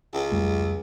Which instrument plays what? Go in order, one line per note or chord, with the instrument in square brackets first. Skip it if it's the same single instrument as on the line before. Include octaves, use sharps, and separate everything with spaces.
[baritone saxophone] C#2
[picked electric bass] F2 G3 A3